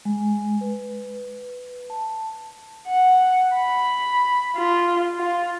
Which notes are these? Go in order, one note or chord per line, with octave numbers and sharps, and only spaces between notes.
G#3
B4
A5
F#5
B5
F4
F4